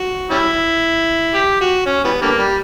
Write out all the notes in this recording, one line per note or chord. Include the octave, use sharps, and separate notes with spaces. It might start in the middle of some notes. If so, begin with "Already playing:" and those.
Already playing: F#4
G3 C#4 E4
G4
F#4
C#4
E3 G3 B3
D3 G3 A#3
G3